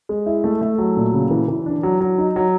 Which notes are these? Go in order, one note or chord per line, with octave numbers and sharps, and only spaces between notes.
G#3
E4
A3
A3
F#3
A#2
C#3
E3
E3
D4
F#3
F#3
D#4
F#3